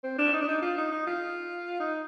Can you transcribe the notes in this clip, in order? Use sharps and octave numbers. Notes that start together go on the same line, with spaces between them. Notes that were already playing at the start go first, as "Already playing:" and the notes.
C4
D4
D#4
D4
D#4
F4
D#4
D#4
F4
D#4